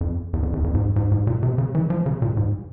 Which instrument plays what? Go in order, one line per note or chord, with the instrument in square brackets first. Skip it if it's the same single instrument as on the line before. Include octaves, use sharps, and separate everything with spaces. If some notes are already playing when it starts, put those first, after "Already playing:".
[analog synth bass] F2
E2
F2
E2
F2
G#2
G2
G#2
G#2
A#2
C3
C#3
E3
F3
C#3
A#2
G#2